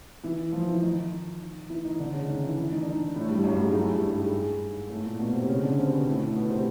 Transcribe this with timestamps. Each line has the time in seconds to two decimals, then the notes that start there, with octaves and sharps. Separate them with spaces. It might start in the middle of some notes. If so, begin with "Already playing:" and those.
0.23 E3 E4
0.53 F3 F4
0.67 E3 E4
0.82 D#3 D#4
1.70 E3 E4
1.84 D#3 D#4
1.99 D3 D4
2.13 C#3 C#4
2.27 D#3 D#4
2.42 E3 E4
2.57 E3 E4
2.72 D#3 D#4
2.82 D4
2.87 D#3 D#4
3.15 A2 A3
3.29 G2 G3
3.44 F#2 F#3
3.54 G2 G3
3.64 G#2 G#3
3.74 A2 A3
3.89 G2 G3
4.02 G2 G3
4.17 G#2 G#3
4.90 A2 A3
5.04 A#2 A#3
5.19 B2 B3
5.33 C3 C4
5.49 C#3 C#4
5.63 D3 D4
5.78 C3 C4
5.92 B2 B3
6.07 A2 A3
6.21 A2 A3
6.35 B2 B3
6.50 C3 C4